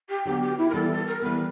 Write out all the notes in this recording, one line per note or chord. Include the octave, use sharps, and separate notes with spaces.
G4
D3 F#3 B3 G4
G4
E4
A#4
E3 G3 B3 A4
A4
A#4
E3 G3 B3 B4